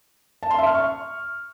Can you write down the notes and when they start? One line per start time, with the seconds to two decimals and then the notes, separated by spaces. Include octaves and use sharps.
0.43 A5
0.51 C6
0.59 E5
0.67 F6
0.74 C#6